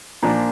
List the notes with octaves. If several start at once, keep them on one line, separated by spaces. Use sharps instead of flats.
A#2 F3 A#3 D4